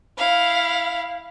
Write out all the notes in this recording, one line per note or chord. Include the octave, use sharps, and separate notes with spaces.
E4 F5